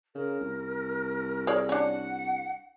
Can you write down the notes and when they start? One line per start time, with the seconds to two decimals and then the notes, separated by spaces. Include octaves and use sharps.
0.15 C#3 A#4
0.41 C2
1.47 G#4 C#5 D5
1.69 C#4 D4 F#5